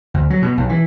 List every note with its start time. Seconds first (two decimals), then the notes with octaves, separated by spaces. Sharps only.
0.14 D2
0.30 F#3
0.42 B2
0.57 B1
0.69 E3